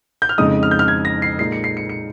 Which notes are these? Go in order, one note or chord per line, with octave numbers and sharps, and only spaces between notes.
G6
F6
F2 C#3 G#3 D#4 D#6
F6
G6
F6
G#6
A#6
C7
A#2 G#3 D#4 C7
C#7
C7
C#7
C#7